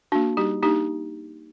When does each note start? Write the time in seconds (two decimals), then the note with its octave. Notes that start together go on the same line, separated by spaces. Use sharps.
0.12 A#3 D4 F#4
0.37 G3 D#4 G4
0.63 A#3 D4 D#4 G4